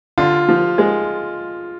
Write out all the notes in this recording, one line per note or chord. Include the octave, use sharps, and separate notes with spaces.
D3 F4
F3
G#3